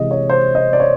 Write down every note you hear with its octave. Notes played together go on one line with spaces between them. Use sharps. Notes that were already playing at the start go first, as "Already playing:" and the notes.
Already playing: C3 E3 G#3 D#5
C#5
C5
D#5
D5
C#5